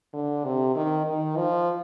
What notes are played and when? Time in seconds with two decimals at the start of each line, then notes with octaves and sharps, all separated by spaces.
0.14 D3
0.45 C3
0.75 D#3
1.06 D#3
1.37 F3